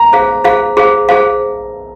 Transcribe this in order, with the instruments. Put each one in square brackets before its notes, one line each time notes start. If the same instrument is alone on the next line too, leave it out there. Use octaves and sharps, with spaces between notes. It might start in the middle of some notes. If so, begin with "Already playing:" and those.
Already playing: [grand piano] A#5
[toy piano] G#4 C5 F5
G#4 C5 F5
G#4 C5 F5
G#4 C5 F5